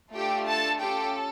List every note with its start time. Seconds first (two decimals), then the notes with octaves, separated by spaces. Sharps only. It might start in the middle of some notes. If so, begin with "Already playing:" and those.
0.14 A3 D4 F4 G4 A4 G5
0.47 A4 A5
0.81 C#4 F4 G4 A4 G5